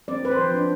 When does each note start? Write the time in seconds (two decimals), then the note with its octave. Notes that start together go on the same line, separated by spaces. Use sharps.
0.08 C4 D5
0.23 C4 B4
0.32 C5
0.38 F3
0.54 D4